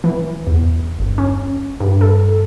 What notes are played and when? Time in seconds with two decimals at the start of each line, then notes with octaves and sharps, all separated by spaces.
0.04 E3
0.47 E2
0.99 G1
1.18 C#4
1.80 G2
2.01 A4